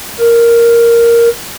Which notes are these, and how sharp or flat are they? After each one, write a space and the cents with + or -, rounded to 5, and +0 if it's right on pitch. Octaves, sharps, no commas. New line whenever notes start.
A#4 +0